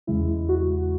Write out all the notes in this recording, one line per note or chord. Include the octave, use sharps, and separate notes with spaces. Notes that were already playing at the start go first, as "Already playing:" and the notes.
E2 C#3 G#3 E4
F#4